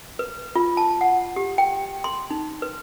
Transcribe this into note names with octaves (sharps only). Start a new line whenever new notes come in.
B4
F4
A5
F#5
G4
G5
C6
D#4
B4